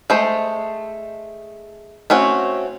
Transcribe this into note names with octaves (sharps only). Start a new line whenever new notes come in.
G#3 A3 C5
A3 C4 C#4 F#4